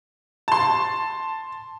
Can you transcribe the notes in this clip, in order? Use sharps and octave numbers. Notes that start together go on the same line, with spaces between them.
A5 C6